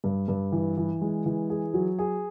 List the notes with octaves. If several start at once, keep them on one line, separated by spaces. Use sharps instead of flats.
G2
G2
E3
E3
G#3
E3
G#4
F#3
G#4